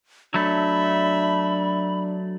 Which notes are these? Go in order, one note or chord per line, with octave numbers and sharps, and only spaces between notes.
F#3 A3 D4 E5 B5